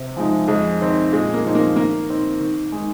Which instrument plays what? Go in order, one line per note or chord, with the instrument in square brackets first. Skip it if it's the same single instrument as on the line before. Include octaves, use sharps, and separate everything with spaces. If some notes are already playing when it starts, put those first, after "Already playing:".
Already playing: [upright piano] C3
F3 G#3 D#4
[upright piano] F2 [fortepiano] G#3
[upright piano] D#3 C4 D#4
[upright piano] A#2 [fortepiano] G#3
[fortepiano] A#3
[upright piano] F3 C4 D#4
[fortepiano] A#3
[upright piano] D#3 [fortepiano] A#3
[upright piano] C4 D#4
D#3
G#3 D#4